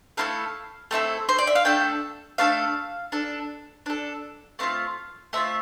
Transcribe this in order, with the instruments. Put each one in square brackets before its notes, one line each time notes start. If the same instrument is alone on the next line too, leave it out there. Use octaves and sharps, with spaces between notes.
[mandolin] A3 C4 E4 A4 F5
A3 C4 E4 A4
C5
D5
E5
F5
A3 D4 A4 G5
A3 D4 A4 F5
D4 A4
D4 A4
A3 C4 F4 F5
A3 C4 F4 E5